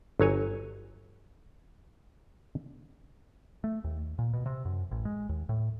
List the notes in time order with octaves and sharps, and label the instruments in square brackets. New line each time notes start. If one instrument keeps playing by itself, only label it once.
[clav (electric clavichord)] G1 F#3 C#5 G#5
[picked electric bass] A3
D#2
A#2
B2
C3
F#2
A1
G#3
D#2
A2